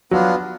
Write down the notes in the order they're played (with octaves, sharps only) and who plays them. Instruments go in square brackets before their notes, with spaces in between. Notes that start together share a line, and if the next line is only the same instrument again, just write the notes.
[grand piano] F#3 [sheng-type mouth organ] B3 D4 F4